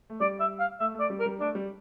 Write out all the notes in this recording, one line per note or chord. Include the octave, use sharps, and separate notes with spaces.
A3
G3 D5
E5
F5
A3 E5
A3
D5
G3
A#4
G3
A3 D4
G3